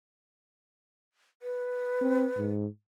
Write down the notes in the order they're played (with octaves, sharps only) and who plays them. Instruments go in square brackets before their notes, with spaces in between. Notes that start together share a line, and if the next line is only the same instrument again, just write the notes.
[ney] B4
[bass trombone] C4
G#2